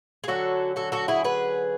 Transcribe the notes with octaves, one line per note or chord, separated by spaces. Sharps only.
G#4
D3 F#3 C#4 F#4 A4
F#4 A4
F#4 A4
E4 G#4
G#4 B4